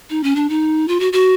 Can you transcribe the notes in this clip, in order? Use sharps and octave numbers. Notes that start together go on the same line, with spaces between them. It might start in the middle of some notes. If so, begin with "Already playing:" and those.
D#4
C#4
D4
D#4
F4
F#4
F#4